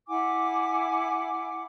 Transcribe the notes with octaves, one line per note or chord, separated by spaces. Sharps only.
E4 F#5 G#5 D6